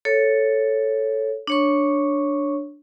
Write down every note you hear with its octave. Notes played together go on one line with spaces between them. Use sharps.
A4 C#5
D4 C#5 C#6